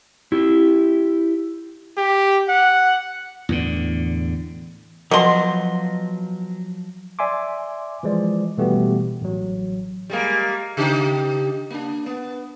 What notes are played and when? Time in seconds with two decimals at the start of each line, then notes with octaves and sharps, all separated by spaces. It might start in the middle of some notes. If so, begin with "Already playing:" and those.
0.32 E4 G4
1.97 G4
2.49 F#5
3.49 E2 A2 D3
5.11 B2 F3 F#3 C6
7.19 D5 E5 G#5 C6 D6
8.03 E3 F3 G#3 D5
8.57 B2 E3 G3 A3 B3 G4
9.21 A1 F#3
10.10 G3 G#3 A#3
10.77 C#3 D#4 G4
11.70 A#3 D4
12.06 B3